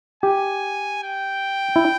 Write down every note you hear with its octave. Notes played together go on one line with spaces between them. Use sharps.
G4 G#5
G5
E4